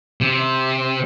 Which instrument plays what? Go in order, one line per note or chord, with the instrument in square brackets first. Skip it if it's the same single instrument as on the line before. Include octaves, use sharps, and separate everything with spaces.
[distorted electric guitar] C3